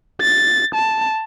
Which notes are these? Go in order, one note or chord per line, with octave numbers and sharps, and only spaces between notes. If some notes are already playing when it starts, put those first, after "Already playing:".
A6
A5